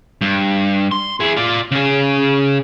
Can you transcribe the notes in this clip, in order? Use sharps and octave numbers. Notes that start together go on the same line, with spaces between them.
G2
C6
E4 G#4
F4 D5
C#3 G#4